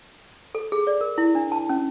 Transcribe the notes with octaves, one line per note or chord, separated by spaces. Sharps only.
A4
G#4
D5
A#4
E4
D4
A5
C#4